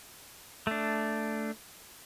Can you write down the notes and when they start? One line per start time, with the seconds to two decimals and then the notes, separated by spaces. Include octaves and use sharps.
0.67 A3 D4